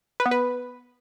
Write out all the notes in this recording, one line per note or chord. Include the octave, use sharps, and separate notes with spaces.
B4
B3
B4